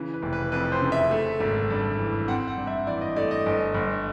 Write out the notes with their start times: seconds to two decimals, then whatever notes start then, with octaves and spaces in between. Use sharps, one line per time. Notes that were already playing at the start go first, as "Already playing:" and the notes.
Already playing: C#3 E3
0.14 B4
0.23 F1
0.33 B4
0.52 F2 B4
0.72 C5
0.82 C#3
0.92 E5
1.11 A3
1.40 G#1
1.70 G2
1.98 E3
2.28 C4 F#5
2.48 F#5
2.57 G2
2.67 E5
2.87 E3 D5
3.01 D#5
3.16 A3 D5
3.31 D#5
3.46 G1
3.74 G1